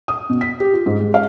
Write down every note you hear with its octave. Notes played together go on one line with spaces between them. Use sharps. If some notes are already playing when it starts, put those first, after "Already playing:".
D#6
B2
B6
G4
F4
G#2
G#3
F5